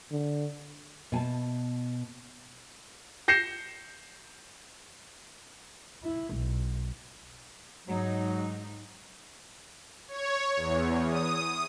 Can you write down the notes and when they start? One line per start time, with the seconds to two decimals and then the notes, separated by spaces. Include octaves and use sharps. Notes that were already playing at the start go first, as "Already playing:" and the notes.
0.11 D3
1.12 B2 G#5 A5
3.28 G6 A#6 C7 C#7 E7
6.04 E4
6.35 B1
7.87 G#2 F#3 D#4
10.08 C#5
10.56 E2
11.06 D#6